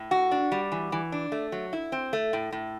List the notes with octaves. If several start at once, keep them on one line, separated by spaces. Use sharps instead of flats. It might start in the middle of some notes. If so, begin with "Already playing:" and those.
Already playing: A2
F#4
D4
G3
E3
E3
D4
A3
F#3
E4
C4
A3
A2
A2